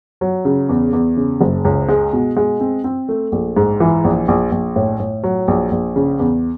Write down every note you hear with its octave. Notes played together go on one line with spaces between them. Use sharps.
F#3
C#3
E2
E2
C#3
F#1
C#2
G#3
B2
G#3
C4
C4
A3
A#1
G#2
E3
A#1
A#1
A#1
A2
A2
F#3
A#1
A#1
C#3
E2